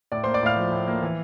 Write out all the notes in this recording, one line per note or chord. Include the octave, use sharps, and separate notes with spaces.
A2 D5 D6
A#3 C5 C6
D5 D6
A2 F5 F6
F3
A2
A#3
E3